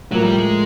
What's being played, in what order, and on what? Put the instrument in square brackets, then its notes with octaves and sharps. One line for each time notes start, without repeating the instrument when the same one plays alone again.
[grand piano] A2 F3 A#3 [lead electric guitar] F#3
[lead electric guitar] G3
G#3